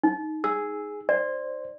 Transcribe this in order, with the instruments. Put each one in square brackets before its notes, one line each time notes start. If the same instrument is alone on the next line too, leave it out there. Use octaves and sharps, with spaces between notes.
[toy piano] D#4
[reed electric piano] G#4 [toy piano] E6
[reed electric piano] C5 [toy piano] D5